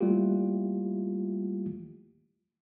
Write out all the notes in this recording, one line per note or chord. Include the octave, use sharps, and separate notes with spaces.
G3 A3 A#3 E4 F4 G4